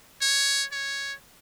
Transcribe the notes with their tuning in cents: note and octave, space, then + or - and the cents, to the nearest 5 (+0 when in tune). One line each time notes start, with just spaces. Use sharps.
C#5 +5
C#5 +0